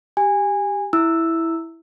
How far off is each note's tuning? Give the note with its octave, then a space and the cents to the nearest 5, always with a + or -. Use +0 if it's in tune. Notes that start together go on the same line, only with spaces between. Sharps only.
G4 +0 G#5 -20
E4 +0 E6 +0